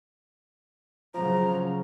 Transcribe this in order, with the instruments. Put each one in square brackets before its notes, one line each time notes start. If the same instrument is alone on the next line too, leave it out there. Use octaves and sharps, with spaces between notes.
[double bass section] C#3 F#3 [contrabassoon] F3 [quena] A#5